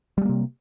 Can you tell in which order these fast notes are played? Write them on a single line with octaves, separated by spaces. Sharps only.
G3 G#3 A#3 C3